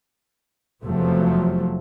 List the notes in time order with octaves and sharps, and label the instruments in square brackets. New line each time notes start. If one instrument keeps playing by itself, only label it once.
[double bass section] F1 E2 C3 F3 F#3 A3